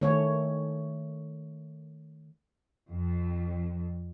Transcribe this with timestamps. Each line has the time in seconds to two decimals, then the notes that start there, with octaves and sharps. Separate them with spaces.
0.01 D#3 A3 C#5
2.89 F2